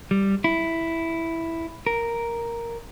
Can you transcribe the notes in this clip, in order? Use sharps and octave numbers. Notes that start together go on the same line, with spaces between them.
G3
E4
A#4